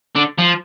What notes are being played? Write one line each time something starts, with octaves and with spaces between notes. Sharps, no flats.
D3
F3